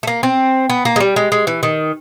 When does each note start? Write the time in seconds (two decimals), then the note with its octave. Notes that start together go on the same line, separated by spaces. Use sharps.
0.03 A3
0.07 A#3
0.23 C4
0.70 B3
0.85 A#3
0.96 G#3
1.00 G3
1.16 G#3
1.32 G#3
1.47 E3
1.63 D#3